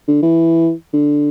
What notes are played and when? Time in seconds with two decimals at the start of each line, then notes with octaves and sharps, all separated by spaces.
0.08 D3
0.22 E3
0.93 D3